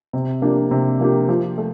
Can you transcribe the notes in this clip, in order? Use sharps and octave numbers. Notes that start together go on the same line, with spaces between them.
C3
F3 A#3 D4 G4
C3
F3 A#3 D4 G4
F3
A3